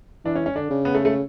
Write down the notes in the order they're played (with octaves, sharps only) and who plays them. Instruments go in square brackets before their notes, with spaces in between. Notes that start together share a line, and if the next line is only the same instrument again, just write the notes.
[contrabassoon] E3 [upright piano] D4
[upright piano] C#4
C#4
[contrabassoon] D3 [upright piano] D4
[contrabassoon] C#3
[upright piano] B3
A3
A3